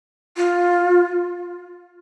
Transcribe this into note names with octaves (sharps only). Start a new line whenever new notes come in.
F4